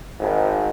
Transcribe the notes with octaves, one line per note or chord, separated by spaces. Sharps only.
G#1